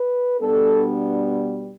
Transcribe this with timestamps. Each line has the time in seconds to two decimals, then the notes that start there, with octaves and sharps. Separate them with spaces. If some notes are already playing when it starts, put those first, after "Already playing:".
Already playing: B4
0.40 B2 G3 B3 D4 A4